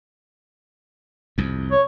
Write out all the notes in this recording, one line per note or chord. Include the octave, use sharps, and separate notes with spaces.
C2 F2
C#5